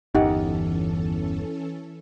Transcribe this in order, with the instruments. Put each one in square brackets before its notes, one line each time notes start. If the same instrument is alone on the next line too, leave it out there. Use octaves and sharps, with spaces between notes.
[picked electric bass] G1 E2 [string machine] E3 C#4 A4 [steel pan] D#4 G4 F#5